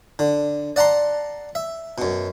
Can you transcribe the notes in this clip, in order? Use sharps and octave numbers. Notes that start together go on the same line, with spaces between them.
D3
D5 F#5 A5 A#5 C6
E5
F#2 B2